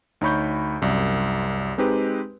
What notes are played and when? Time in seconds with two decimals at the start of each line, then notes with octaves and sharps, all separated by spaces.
0.21 D2 D#4 C#5 B5 C#6 G6
0.82 C2 F#2
1.78 G#3 C4 D#4 G4 B4